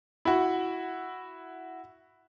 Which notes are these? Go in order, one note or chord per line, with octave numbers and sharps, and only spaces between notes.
E4 F#4